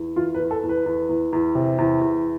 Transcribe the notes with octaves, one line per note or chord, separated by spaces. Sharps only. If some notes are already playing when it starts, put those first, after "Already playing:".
Already playing: E2
E3 F4
B4
E2
A4
E2
B4
E2
E2
E2
C3
E2
E2